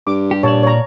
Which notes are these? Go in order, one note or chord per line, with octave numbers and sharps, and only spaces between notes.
G2 D6
G4
A#2 C#5 D5 A5
C#5 A#5